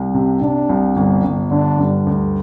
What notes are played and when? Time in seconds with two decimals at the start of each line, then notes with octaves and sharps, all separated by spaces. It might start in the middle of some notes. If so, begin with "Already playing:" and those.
Already playing: C2
0.14 C3
0.41 C3 D4
0.69 C2
0.96 G1
1.24 G1
1.51 D3 D4
1.79 G2
2.07 D2